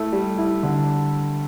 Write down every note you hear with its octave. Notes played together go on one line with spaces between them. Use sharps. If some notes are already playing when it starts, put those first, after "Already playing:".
Already playing: A3 E4
G3
E4
D3